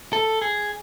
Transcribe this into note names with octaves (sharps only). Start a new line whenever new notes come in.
A4
G#4